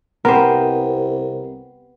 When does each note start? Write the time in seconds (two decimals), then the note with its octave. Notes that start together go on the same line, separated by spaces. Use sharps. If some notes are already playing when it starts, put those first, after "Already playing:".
0.25 C2 C3 B3 G4 A#4 C5